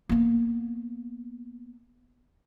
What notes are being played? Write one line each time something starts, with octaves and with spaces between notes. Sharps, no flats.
A#3 B3